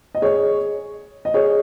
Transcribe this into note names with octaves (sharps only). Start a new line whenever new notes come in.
D#5
G#4 C#5
D#5
G#4 C#5